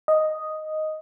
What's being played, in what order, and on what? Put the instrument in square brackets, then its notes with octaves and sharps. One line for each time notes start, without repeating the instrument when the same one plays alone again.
[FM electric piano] D#5